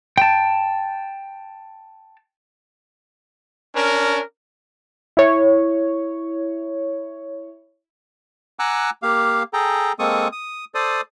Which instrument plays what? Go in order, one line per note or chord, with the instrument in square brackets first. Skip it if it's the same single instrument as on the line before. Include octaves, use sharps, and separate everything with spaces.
[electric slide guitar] G5 A5
[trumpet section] C#4 D4 A#4
[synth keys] E4 C#5
[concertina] F#5 G#5 A#5 D6 E6 F#6
A#3 G4 F5
G#4 A4 G5 A#5
G#3 A#3 C4 A4 C#6 D#6
D#6
A4 C5 D5 D#6